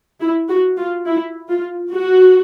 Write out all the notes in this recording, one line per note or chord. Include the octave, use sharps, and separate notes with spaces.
E4
F#4
F4
E4
F4
F#4